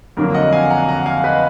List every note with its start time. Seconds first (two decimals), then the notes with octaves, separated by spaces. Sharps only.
0.17 F2 D3 F#3 A#3 D4 A#4
0.34 D#5 F#5
0.52 F5 G#5
0.70 F#5 A#5
0.89 F#5 A#5
1.06 F5 G#5
1.24 B4 D#5